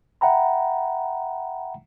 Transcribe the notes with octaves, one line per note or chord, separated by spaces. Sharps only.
E5 F#5 G5 A#5 B5